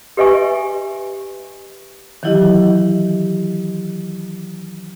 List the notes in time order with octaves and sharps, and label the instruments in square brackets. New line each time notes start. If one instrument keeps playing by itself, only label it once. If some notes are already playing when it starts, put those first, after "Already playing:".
[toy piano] G4 B4 D#5 E5 G#5 C#6
[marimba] D#3 E3 F#3 E4 G4 D#5